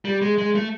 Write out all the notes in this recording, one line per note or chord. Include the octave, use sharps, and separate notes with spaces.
G3
G#3
G#3
A3